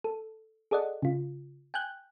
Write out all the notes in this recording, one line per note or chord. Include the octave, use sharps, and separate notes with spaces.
A4
G#4 A4 D5 D#5 F#5
C#3 F4
G5 G#5 F#6 G6